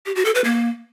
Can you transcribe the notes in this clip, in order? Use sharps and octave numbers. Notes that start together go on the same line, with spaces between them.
G4
F#4
A4
B4
A#3